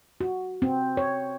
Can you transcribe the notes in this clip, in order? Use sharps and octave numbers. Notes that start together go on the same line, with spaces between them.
F#4
C4
C#5